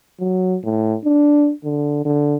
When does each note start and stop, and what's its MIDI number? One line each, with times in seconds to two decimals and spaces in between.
0.20 0.57 54
0.64 0.95 45
1.04 1.52 62
1.64 2.04 50
2.05 2.36 50